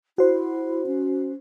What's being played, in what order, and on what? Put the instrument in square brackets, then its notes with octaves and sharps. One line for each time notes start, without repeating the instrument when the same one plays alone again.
[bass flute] E4 [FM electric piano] F#4 C5
[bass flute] C#4